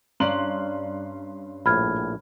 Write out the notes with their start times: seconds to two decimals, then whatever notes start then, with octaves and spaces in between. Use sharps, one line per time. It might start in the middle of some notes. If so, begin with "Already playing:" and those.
0.20 G2 C#4 D5 A#5 C6 F#6 F#7
1.66 A#1 A2 B5 F6 G#6